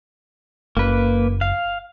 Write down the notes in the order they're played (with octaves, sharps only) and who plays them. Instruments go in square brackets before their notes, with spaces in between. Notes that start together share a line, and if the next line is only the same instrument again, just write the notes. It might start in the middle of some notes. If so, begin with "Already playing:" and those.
[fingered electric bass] F#1 [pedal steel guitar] A#3 B4
[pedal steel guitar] F5